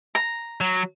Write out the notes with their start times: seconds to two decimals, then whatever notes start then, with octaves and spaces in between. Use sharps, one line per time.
0.15 A#5
0.61 F#3